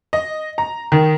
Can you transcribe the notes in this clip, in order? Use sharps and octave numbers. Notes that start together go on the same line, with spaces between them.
D#5
A#5
D#3